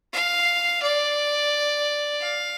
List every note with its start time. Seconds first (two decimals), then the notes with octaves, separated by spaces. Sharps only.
0.13 F5
0.82 D5
2.21 F5